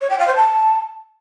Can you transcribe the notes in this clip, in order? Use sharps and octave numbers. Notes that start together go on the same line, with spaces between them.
C#5
G5
F5
C5
A5